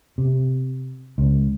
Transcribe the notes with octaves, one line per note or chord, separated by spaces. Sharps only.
C3
C#2